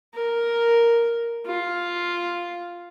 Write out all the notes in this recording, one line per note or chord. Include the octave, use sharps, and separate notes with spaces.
A#4
F4